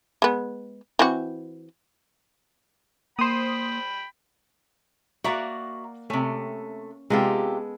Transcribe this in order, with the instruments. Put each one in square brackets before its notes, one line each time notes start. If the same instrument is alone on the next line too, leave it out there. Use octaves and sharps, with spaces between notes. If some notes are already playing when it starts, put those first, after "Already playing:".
[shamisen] G#3 B3
E3 C4 F#4
[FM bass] A#3 [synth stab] C5 D#6 [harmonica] G5 B5
[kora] A#3 D5 F#5 [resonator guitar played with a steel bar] F#4 E5 A#5
[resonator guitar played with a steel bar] C3 A3 [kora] C#4
[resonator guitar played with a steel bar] C3 F4 G4 [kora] G#3 B3 A4